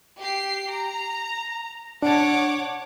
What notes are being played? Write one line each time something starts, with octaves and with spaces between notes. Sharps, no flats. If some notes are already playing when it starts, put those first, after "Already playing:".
G4 C7
A#5
D4 C#5 F#5 A5 D6